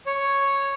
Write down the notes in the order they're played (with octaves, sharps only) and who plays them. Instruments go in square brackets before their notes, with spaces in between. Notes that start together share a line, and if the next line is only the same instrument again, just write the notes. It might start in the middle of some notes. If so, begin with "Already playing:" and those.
[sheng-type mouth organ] C#5